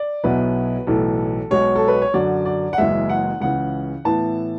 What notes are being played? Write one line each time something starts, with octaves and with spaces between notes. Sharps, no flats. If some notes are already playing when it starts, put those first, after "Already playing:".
Already playing: D5
B1 B2 F#3 B3 E4 B4
B1 A2 E3 A4
B1 B2 G#3 C#5
A4
B4
C#5
F#2 D3 F#3 D5
D5
F#5
F#1 F#2 E3 G#3 E5
F#5
C#2 C#3 E3 F#5
A2 E3 B3 E4 A5